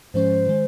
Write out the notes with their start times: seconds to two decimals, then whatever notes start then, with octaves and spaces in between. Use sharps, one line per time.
0.14 G#2 F3 G#3 C#4 C5
0.47 D#3 G#3